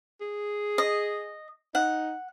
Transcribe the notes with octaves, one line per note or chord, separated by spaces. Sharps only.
G#4
D#5
D#4 F#5